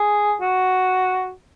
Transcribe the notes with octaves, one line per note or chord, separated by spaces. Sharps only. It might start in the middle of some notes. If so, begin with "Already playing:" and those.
Already playing: G#4
F#4